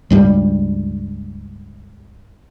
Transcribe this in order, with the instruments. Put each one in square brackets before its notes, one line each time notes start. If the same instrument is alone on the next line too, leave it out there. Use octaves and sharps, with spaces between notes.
[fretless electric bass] C#2 G2 G3